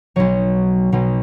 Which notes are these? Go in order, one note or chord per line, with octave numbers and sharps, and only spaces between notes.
B1 B2 F#3 C#5
B1 B2 F#3